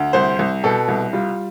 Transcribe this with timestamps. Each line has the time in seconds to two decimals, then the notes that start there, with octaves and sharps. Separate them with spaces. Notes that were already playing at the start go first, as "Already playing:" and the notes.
Already playing: D2
0.13 C2 C5
0.39 C2
0.64 B2 A4
0.88 C2
1.13 G3 F4